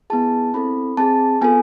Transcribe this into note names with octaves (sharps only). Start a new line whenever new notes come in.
B3 E4 G#4 A5
C4 E4 A4 B5
C4 G#4 A5
B3 F4 A4 G#5